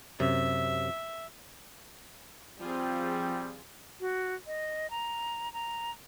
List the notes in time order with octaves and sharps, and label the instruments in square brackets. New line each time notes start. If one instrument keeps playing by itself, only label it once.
[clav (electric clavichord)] F#2 C3 [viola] E5
[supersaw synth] F3 F4 G#4 [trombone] G3 [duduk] C4
[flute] F#4
D#5
A#5
A#5